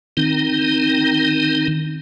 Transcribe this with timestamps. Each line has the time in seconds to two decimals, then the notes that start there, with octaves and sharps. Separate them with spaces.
0.17 D#3 C4 D#4